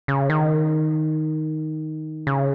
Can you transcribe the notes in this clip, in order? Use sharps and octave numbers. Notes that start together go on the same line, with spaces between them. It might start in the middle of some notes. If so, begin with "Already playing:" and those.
C#3
D#3
C#3